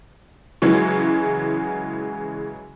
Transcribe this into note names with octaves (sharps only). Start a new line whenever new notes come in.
C#3 E3 F#3 G#3